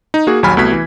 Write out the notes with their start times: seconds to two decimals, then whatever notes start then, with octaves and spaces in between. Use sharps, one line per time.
0.14 D#4
0.27 A#3 F#4 G#4
0.43 A#1 D#2 F#3 G#5 B5 F6
0.57 C2 A3 B3 F#4 G#6 B6
0.72 E3